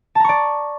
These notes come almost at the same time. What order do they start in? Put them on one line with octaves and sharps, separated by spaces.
A5 A#5 C#6 D5